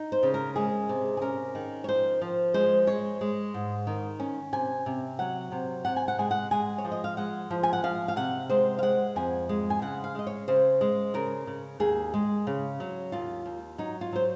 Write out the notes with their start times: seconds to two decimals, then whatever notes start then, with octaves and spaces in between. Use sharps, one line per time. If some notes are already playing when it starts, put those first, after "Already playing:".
Already playing: D#4
0.12 C5
0.23 C#3
0.34 A#4
0.56 G#3 G#4
0.89 C3
1.17 G#4
1.21 C#4 A#4
1.55 D#3
1.84 C#5
1.88 F3 C5
2.21 F3
2.54 G#3 C5
2.87 G#3 C#5
3.21 G#3
3.54 G#2
3.87 D#3
4.20 C#4
4.53 C3 G#5
4.86 C3
5.19 F#3 F#5
5.52 C3
5.85 C3 F#5
5.96 G#5
6.08 F#5
6.18 G#3 G#5
6.31 F#5
6.51 G#3 G#5
6.78 C#5
6.85 F3
6.92 D#5
7.04 F5
7.17 G#3 F#5
7.50 F3
7.63 G#5
7.73 F#5
7.84 F3 F5
8.08 F5
8.16 C3 F#5
8.49 G#3 C5
8.79 F5
8.82 G#3 F#5
9.16 F2 G#5
9.49 G#3
9.70 G#5
9.82 C#3 F#5
10.04 F5
10.15 G#3 D#5
10.27 C#5
10.48 C#3 C5
10.81 G#3
11.14 C#3 A#4
11.47 C#3
11.80 D#2 G#4
12.14 G#3
12.47 C#3
12.80 F#3
13.12 D#2 F4
13.46 D#2
13.78 F#3 D#4
14.01 F4
14.12 F#3 C5